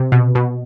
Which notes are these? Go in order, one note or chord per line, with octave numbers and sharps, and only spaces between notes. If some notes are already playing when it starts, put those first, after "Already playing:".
Already playing: C3
B2
B2